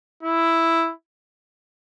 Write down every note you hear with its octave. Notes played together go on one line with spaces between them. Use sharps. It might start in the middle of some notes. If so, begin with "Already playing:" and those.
E4